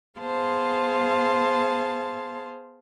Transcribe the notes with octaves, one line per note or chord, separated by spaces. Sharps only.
B3 G#4 C5 F5 A5 C6